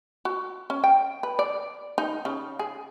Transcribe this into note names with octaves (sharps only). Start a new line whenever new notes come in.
F#4
C#4
G5
B4
D5
D#4
C#3
G#4